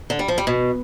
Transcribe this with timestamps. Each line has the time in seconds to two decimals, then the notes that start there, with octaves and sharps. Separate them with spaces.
0.10 D3
0.19 G3
0.28 F3
0.38 G3
0.47 B2